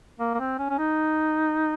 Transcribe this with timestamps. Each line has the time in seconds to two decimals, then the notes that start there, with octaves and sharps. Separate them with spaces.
0.20 A#3
0.34 A#3
0.40 C4
0.59 C#4
0.70 C#4
0.79 D#4